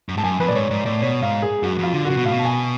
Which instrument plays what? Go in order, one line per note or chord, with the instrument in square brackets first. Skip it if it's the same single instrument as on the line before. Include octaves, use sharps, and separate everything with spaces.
[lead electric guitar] F#2
[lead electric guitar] G#2 [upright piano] A5
[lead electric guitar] F#2 [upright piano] G#5
[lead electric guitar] F2 [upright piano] B4
[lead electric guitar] A2 [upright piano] D5
[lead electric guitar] G#2 [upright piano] C#5
[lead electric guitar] G#2 [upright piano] D5
[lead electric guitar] A2 [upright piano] D5
[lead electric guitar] B2 [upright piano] C#5
[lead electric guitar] G#2 [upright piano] F5
[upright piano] G#4
[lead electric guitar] F#2 [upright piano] F#4
[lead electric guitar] F2 [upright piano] F4
[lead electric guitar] D3
[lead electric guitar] C#3 [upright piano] F#4
[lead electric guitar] B2
[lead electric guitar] A2 [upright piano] F5
[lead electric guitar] B2
[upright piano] A5
G#5